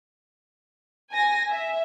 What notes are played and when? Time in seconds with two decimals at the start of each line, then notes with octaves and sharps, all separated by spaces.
1.12 G#5 A#6
1.50 E5